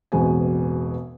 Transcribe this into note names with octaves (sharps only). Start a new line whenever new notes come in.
E1 A1 B2 G#3 C4 G#5